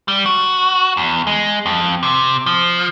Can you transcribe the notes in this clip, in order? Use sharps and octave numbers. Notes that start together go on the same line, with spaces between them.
G3
F#4
E2
G#3
F2
C3
F3